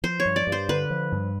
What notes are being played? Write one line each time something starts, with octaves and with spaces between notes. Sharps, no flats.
F3 C5
C#5
G2
D5
G2
C5
D3 B4
F3
G2